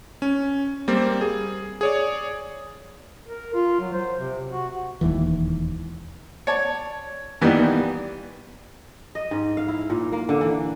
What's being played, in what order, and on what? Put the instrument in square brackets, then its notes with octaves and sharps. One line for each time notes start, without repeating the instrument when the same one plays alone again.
[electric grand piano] C#4
G3 A#3 C4
G#4
G#4 C#5 D5
[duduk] A#4
F4
F#3
C5
C3
F#4
[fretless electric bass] E1 D#2 E3
[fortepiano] C#5 D5 A5
A#2 D#3 E3 G3 B3
[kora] D#5
G#2
F5
E4
A#2
A#3
D3
E3